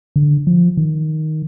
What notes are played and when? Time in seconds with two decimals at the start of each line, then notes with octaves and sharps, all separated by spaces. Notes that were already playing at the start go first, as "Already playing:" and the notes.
0.16 D3
0.47 F3
0.77 D#3